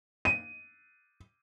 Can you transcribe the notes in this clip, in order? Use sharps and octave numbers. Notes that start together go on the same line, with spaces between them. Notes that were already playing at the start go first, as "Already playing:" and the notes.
D#7